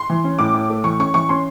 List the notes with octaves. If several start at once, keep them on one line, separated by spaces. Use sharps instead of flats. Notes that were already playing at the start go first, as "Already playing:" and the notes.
Already playing: C6
E3
C#4
A2 D6
A2
A3
E3 C#6
C#4 C#6
E3 C#6
C#4 C6